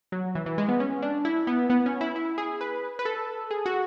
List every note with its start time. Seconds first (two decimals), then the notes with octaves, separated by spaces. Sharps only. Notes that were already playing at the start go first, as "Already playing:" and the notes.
0.12 F#3
0.35 E3
0.46 E3
0.58 G#3
0.68 B3
0.80 C#4
1.02 D4
1.25 E4
1.47 B3
1.70 B3
1.86 C#4
2.01 E4
2.16 E4
2.38 G#4
2.61 B4
2.99 B4
3.05 A4
3.51 G#4
3.66 F#4